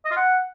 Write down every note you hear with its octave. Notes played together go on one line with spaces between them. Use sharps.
D#5
F4
F#5